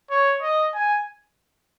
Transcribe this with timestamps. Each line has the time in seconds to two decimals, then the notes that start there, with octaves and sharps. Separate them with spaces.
0.10 C#5
0.42 D#5
0.74 G#5